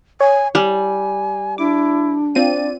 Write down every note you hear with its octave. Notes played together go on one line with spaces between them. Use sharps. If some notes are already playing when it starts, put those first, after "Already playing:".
C#5 G#5
G3 G#5
D4 E4 D6
C4 F4 D5 D#7